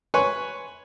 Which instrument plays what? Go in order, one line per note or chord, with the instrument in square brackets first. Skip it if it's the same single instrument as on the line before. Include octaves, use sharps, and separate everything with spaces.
[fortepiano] B4 C#5 G#5 C6 C#6